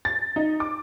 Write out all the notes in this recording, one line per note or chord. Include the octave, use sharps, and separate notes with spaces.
A6
D#4
D6